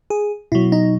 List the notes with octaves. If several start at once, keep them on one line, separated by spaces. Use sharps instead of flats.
G#4
B2 F#3 E4
D#4